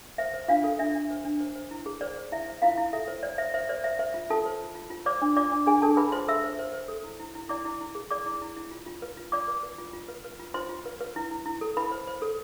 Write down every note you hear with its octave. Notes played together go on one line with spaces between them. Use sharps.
C5 E5
C5
D4 F4 F5
A4
D4 E5
D4
C5
D4
C5
C5
E4
G#4
C5 D5
C5
E4 E5
C5
E4 F4 F5
E4
A4 E5
C5
C5 D5
C5 E5
C5 E5
C5 D5
C5 E5
C5 E5
F4
F4 A4 A5
C5
F4
F4
F4
C5 D5 D6
D4
F4 D5 D6
D4
D4 G#4 G#5
D4 A4 A5
G#4 B4 B5
F4 C5 C6
A4 E5 E6
C5
C5
C5
A4
E4
E4
E4
E4 D5 D6
E4
E4
G#4
G#4 D5 D6
E4
E4
E4
F4
F4
B4
F4
F4 D5 D6
B4
B4
F4
F4
B4
B4
F4
F4 C5 C6
F4
B4
B4
E4
E4
E4
A4
E4 B4 B5
C5
C5
A4